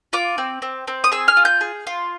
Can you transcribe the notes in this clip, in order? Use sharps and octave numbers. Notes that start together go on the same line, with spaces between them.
F4 D6
C4
C4
C4
D#6
G#4 E6
F6
F4
G6
G#4
F4